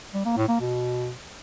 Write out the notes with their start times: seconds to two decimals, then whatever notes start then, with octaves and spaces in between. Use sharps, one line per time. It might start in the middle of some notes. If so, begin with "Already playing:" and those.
0.14 G3
0.25 A#3
0.37 A2
0.48 A#3
0.60 B2